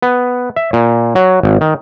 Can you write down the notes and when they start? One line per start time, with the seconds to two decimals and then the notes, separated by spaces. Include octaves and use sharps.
0.02 B3
0.56 E5
0.73 A#2
1.15 F#3
1.43 G#1
1.61 D#3